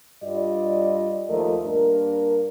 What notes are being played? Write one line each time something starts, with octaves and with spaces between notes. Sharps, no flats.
G2 G3 F4 D5 D#5
D#2 F3 A3 A#4 D#5
G2 A#3 D4 A#4